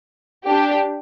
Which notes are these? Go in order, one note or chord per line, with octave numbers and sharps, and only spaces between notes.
D4 G4